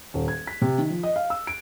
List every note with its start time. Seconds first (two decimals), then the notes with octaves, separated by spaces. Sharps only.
0.14 D#1
0.28 G#6
0.47 B6
0.62 C3
0.78 D#3
0.90 F3
1.03 D#5
1.16 F5
1.30 E6
1.47 D7